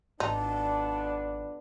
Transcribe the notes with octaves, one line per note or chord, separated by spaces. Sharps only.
G#1 F2 B3 D4 D#4 A5